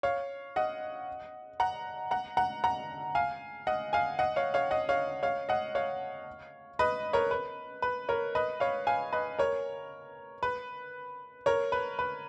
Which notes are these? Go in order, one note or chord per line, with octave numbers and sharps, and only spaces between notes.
C#5 F5
D#5 F#5
F#5 A#5
F#5 A#5
F#5 A#5
F#5 A#5
F5 G#5
D#5 F#5
F5 G#5
D#5 F#5
C#5 F5
C#5 F5
D#5 F#5
C#5 F5
C#5 F5
D#5 F#5
C#5 F5
B4 D#5
A#4 C#5
B4
B4
A#4 C#5
B4 D#5
C#5 F5
F5 G#5
B4 D#5
A#4 C#5
B4
A#4 C#5
B4
B4